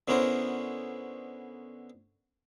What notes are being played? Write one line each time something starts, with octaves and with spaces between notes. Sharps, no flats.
D3 B3 C#4 E4 A#4 C5